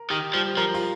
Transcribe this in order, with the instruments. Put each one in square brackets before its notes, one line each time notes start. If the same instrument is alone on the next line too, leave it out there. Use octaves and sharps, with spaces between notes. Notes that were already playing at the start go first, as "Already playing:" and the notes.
Already playing: [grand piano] A#4
[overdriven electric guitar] D#3 [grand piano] G4
[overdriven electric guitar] F3 [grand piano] G3
[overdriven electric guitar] F3 [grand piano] A#4
[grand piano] F4